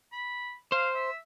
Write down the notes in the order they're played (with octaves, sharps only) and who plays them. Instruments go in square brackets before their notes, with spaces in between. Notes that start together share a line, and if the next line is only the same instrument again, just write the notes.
[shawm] B5
[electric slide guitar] C5 [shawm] F5
[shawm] E5